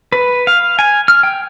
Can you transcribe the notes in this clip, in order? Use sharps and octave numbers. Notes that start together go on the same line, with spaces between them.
B4
F5
G#5
F6
G5